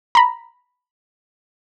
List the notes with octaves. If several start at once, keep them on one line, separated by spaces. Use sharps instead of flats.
A#5 B5